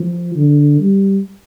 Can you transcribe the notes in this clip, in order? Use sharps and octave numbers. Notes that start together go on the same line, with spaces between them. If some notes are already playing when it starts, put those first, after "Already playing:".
Already playing: F3
D3
G3